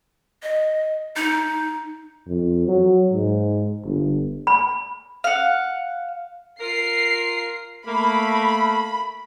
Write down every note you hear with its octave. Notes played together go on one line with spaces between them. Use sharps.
D#5
D#4
F2
F#3
G#2
G1
B5
F5 F#5
F4 A#4 C7
A3 A#3 B5